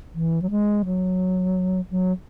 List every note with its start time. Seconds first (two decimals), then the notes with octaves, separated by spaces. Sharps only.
0.15 E3
0.42 F#3
0.50 G#3
0.85 F#3
1.91 F#3